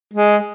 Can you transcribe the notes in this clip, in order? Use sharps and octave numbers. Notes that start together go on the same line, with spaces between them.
G#3